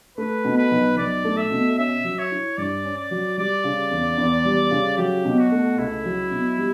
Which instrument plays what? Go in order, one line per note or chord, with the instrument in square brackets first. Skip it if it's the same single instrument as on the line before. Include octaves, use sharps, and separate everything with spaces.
[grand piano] A3 [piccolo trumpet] B4
[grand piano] B2
[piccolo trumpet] B4
[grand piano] B1
[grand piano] B1 [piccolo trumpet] D5
[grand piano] A3
[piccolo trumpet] E5
[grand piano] B2
[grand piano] C#4 [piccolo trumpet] E5
[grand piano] F#3
[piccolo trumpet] C#5
[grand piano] E4
[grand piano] G2 [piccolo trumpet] D5
[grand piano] C#4
[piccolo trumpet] D5
[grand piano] F#3
[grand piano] G3 [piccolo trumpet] D5
[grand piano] C#3
E2
E2
G3
C#3
[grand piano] F#3 [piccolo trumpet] G4
[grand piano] B2
[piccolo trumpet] F#4
[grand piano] A3
[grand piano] C#2 [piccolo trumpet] E4
[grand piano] F#3
B2
G3